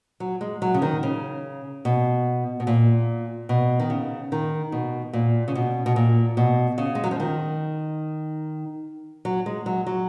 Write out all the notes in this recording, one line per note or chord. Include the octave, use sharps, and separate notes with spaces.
F#3
G#3
F#3
C#3
D#3
C#3
B2
B2
A#2
B2
D#3
C#3
D#3
B2
A#2
C#3
B2
B2
A#2
B2
C#3
G#3
F#3
F3
D#3
F#3
G#3
F#3
F#3